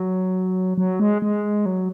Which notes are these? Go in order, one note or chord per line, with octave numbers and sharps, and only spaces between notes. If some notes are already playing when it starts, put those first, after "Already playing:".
Already playing: F#3
F#3
G#3
G#3
F#3